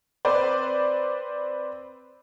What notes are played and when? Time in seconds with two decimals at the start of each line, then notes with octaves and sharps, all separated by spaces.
0.25 C4 B4 C5 D5